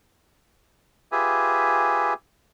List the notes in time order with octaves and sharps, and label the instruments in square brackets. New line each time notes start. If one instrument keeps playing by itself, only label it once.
[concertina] F4 G4 G#4 B4 E5 G#5